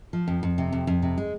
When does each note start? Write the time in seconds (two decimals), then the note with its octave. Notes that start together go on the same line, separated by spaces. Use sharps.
0.13 F3
0.28 F2
0.43 F2
0.58 C3
0.72 F2
0.87 F2
1.02 C3
1.18 G#3